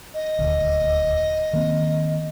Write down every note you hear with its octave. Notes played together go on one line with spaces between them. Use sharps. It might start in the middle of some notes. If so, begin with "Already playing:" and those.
D#5
D#1 D2
D#3 A#3 C4